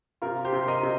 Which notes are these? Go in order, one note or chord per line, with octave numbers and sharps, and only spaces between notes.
C3 F4 A#4
G4 C5
C3
C5
A#4 D#5
C3